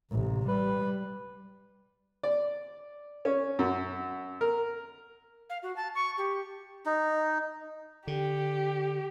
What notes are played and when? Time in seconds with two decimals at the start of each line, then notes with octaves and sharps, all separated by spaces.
0.11 A1 C3
0.48 G3 B4
2.23 D5
3.25 C#4
3.59 F#2
4.41 A#4
5.50 F5
5.63 F#4
5.76 A5
5.95 C#6
6.18 G4
6.86 D#4
8.07 D3 G4